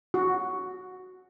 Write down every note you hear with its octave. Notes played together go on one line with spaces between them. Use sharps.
F#4